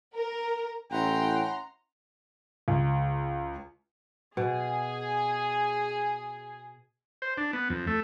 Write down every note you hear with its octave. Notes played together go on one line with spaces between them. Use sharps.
A#4
A1 C#4 E4 F#5 G5 A#5 C6
C#2
B2 G#4
C5
D4
B3
F2
A3